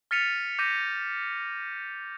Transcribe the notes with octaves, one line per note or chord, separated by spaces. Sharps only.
F6 A6 B6 C#7 D#7 F7
D6 G6 A#6 B6 D#7